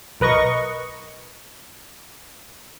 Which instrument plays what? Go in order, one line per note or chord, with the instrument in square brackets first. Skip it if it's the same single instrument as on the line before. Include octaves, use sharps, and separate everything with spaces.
[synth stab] B1 A#4 B4 D#5 C#6